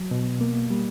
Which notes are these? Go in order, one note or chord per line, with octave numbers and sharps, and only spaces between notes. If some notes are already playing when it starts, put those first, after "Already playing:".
Already playing: F#3
B2
A#3
G3